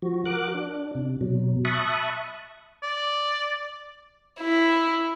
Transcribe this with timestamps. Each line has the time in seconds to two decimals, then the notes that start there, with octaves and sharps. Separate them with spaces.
0.02 F3 F#4
0.25 F#4 A#4 D6 F#6
0.54 D4
0.95 C3
1.21 B2 F#3
1.65 E5 A5 B5 C#6 D#6 F#6
2.83 D5
4.41 E4